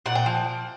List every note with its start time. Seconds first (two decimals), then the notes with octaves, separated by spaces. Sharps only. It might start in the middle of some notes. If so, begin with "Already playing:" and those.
0.06 A#2 F#5
0.15 G5
0.26 F3